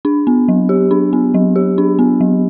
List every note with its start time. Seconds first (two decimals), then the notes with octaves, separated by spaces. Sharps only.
0.05 D4
0.27 B3
0.48 F#3
0.69 G4
0.91 D4
1.13 B3
1.34 F#3
1.56 G4
1.78 D4
1.99 B3
2.21 F#3